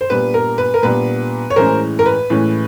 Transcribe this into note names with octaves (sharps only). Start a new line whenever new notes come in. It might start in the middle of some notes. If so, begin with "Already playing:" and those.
C5
A#2 G3 B3 D4 B4
A#4
B4
A#4
A#2 G3 B3 D4 B4
C#5
A2 E3 G#3 C#4 A#4 C5
A#4
B4
A2 E3 G#3 C#4